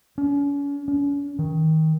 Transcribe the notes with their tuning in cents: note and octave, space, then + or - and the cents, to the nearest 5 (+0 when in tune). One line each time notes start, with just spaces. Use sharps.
C#4 +40
C#4 +40
D#3 +25